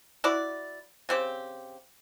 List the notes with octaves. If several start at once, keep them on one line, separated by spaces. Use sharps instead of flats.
E4 F#4 D5
C#3 C4 G4